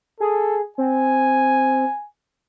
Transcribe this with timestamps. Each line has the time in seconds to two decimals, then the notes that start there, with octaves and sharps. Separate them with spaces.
0.20 G#4 A4
0.78 C4 G#5